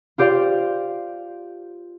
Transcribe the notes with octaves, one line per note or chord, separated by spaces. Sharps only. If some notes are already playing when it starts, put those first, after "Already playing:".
F4 G4 C5 D5 F5